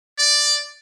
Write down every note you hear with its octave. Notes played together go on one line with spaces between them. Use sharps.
D5